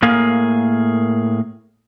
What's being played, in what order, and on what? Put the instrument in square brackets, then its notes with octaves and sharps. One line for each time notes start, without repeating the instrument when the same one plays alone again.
[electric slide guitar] A2 A#3 G#4 A#4 F5